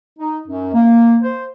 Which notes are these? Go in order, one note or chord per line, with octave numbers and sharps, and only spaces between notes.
D#4
F#2
A#3
C5